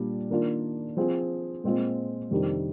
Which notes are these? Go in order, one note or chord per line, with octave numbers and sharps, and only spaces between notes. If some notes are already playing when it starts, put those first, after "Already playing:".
Already playing: A#2 G3 D4
D#3 A#3 D4 F4
F3 C4 F4 G#4
A#2 G#3 C4 F4
F2 C3 D#3 G3 D4